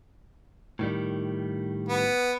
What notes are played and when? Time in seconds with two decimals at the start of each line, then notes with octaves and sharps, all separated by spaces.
0.79 A2 D#3 G3
1.89 B3